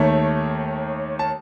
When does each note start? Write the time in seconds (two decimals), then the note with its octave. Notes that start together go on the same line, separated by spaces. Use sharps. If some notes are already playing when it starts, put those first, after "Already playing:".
Already playing: D#2 D#3 A3 C#5
1.19 A5